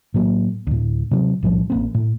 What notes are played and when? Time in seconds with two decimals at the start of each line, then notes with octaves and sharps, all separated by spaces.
0.14 A2 F#3 A#3
0.67 D2 A2
1.11 C3 F#3 G#3 C4
1.43 B1 A2 F3 G3
1.70 A1 A#3 C4
1.94 A2